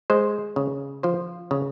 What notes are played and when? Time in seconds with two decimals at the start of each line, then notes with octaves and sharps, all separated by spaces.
0.10 G#3 C5
0.56 C#3
1.03 F3 C5
1.51 C#3